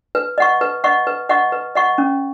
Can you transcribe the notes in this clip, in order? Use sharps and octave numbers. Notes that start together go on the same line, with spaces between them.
B4
D#5 F#5 C#6
B4
D#5 F#5 C#6
B4
D#5 F#5 C#6
B4
D#5 F#5 C#6
C#4